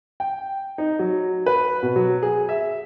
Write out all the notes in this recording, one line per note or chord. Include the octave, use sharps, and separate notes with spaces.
G5
D#4
F#3
B4
B2
F#3
G#4
E5